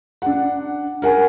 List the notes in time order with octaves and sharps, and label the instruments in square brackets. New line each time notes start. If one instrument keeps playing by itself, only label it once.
[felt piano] D4 F#5
A#4 F#5 G#5